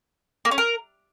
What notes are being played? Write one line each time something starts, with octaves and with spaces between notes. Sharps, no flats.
A#3
C#4
A#4